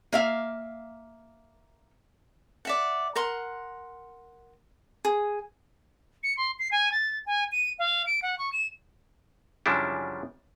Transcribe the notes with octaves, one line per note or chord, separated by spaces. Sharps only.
A#3 E5 F5
D5 E5 F#5
A#4 F#5 C6
G#4
C#7
C6
C7
G#5
A6
G#5
D#7
F5
D7
F#5
C#6
E7
F#2 C#3 F3 G3 D4 E4